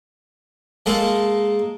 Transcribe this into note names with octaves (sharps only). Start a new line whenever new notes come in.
G#3 A#3 A4